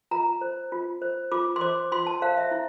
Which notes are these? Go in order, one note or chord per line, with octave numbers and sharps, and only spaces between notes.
F4 A#5
C5
F4
C5
F4 D6
C6
C5 D6
F4 C6
A5
C5 F5
E5
E4